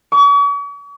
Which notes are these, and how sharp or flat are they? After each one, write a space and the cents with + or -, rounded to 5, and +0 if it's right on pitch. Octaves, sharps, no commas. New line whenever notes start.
C#6 +45